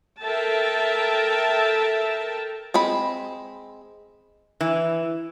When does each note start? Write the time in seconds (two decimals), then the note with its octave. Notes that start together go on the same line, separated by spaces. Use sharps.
0.22 A4 A#4 E5 G5 A5
2.74 G#3 C4 B5
4.61 E3